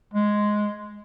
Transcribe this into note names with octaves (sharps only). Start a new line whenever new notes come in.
G#3